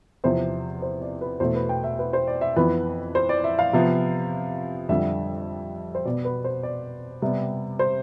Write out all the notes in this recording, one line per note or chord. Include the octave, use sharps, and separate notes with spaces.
E2 C3 F3 C5
C5
D5
B4
E2 B2 A3 C5
B4
G5
E5
B4
C5
D5
E5
F2 E3 B3 B4
C5
D5
E5
F5
C3 F3 B3
F2 D3 G3 E5
C5
B2 B3 D5
B4
C5
D5
C3 G3 B3
C5